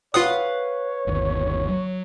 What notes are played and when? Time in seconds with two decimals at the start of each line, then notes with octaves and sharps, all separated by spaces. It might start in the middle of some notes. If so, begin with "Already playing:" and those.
0.14 F4 B4 C#5 F5 F#5 D#6
1.07 G1 D#2
1.68 F#3